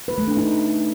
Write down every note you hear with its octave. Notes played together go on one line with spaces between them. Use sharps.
B4
A3
D4
D#4